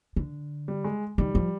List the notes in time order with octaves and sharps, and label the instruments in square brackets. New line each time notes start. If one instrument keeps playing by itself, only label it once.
[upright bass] D3
[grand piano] G3
G#3
[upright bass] D#3 [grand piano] G3
[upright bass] F3